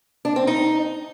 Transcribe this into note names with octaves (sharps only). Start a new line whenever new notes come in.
D4
C4
D#4